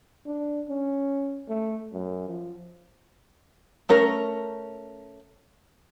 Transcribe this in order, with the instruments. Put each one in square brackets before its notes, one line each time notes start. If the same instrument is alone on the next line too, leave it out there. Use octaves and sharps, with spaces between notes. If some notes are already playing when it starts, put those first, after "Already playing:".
[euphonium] D4
C#4
A3
F#2
F3
[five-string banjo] A3 C#4 A#4